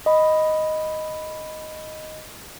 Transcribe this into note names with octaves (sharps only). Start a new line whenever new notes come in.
D#5 B5